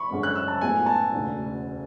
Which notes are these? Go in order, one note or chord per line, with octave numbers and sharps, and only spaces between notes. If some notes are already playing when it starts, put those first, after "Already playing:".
Already playing: B5 C#6
F#1 F#2 D3 G#3 C#4
F#6
E6
A5
A2 G#3 B3 F#4 G#5
A5
E1 D2 C#3